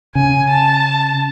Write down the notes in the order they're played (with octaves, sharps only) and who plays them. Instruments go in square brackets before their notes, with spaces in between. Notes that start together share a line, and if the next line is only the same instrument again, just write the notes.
[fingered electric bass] C#3 [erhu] G#5
[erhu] A5